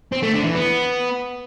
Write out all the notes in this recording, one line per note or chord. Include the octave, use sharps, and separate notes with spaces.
C4
A3
D3
E3
B3